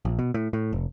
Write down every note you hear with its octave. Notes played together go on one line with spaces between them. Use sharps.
A#1
B2
A2
A2
F1